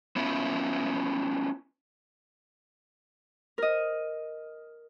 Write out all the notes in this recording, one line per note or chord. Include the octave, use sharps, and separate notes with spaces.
B3 C#4 E4 F4
A#4 D#5